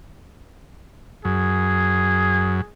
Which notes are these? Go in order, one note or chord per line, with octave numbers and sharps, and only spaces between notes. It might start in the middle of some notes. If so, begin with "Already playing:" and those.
F#2 G#4